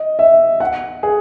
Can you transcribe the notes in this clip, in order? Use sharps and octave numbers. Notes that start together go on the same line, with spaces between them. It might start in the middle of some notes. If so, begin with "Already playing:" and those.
Already playing: D#5
E5
F#5
G#4